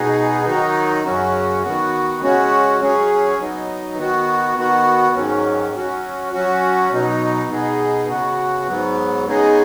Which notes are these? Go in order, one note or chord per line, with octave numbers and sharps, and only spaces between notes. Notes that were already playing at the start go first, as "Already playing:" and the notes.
Already playing: B2 B3 D#4 G#4
D#3 F#3 D#4
F#2 C#3 F#3 C#4 F#4
D#3 B3 F#4
C#3 G#3 C#4 F#4
F#3 C#4 G#4
F#3 B3 D#4
D#3 B3 F#4
D#3 B3 F#4
G#2 D#3 F#3 C#4
F#3 C#4 F#4
F#3 C#4 F#4
B2 F#3 D#4
B2 B3 D#4 G#4
C#3 B3 F#4
G#2 F#3 B3
C#3 G#3 B3 D#4 G#4